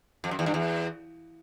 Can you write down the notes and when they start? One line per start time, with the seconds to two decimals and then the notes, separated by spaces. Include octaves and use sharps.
0.24 F2
0.31 F#2
0.39 E2
0.46 G2
0.54 E2